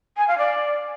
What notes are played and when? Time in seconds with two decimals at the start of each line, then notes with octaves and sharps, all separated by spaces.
0.17 G#5
0.28 F5
0.38 D5